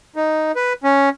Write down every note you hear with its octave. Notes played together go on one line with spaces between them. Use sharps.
D#4
B4
C#4